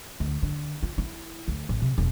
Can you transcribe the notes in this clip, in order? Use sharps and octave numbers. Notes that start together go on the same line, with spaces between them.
D2
D3
F4
E4
D2
A1
C3
E1